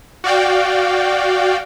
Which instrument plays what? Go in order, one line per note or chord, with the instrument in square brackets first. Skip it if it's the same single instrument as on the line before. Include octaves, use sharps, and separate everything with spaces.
[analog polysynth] F#4 D5 F5 G5